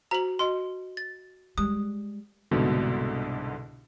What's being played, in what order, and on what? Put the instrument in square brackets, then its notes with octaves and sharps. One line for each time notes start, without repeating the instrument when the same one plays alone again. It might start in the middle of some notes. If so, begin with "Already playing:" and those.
[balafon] F#4 C5 [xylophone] A#5 F#7
[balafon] F#4 D#5 [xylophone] C6
[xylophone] A6
[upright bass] G3 G#3 [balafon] G4 [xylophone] D#6
[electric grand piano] C2 G#2 B2 D3